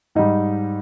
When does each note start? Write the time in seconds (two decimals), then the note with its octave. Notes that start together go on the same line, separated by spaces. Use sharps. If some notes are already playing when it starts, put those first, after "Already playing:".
0.15 G#2 G3 D#4